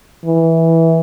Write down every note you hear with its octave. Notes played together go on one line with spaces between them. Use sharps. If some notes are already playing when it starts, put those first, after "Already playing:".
E3